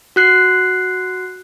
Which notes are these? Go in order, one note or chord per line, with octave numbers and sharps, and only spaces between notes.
F#4 F#6 C7